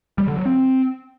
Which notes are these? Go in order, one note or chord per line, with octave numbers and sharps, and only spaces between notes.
G3
D3
F#3
C4